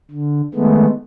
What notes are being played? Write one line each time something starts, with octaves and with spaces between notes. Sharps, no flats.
D3
D#3 G#3 A3 B3